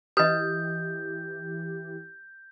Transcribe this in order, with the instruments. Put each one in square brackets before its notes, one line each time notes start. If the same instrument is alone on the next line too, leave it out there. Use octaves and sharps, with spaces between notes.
[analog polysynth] E3 G4 [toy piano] B4 D#5 [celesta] D#6 [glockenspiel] G6